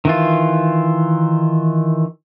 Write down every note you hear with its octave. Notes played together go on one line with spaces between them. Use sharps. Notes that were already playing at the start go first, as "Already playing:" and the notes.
D#3 E3 F4